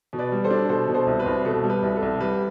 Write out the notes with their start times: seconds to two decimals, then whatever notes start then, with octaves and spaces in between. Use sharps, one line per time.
0.13 B2
0.19 B4 D5
0.32 G3
0.44 A4 C5
0.51 D4
0.69 B2 A4 C5
0.88 B2
0.94 A4 C5
1.07 C2
1.20 B4
1.26 C2
1.45 B2 A4
1.63 G3
1.70 B4
1.83 C2
1.96 A4
2.02 C2
2.20 G3 B4